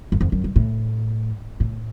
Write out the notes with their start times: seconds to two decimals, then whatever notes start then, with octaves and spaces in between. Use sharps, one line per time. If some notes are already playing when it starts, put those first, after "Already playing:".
0.12 F#2
0.21 F2
0.32 F#2
0.44 G2
0.56 A2
1.60 A2